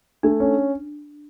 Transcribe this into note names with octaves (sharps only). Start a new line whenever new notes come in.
A3 D4
C#4